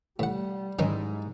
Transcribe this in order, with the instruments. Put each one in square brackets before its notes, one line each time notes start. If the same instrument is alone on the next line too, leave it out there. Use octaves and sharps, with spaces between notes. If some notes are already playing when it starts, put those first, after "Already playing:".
[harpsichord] A2 F#5 [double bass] G3
[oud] G#2 E4 [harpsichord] D#3 C#4 D#4 [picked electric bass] F#3